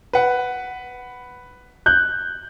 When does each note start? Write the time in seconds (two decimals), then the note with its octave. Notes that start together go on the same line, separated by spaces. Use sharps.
0.13 B4 F#5
1.86 F#6 G6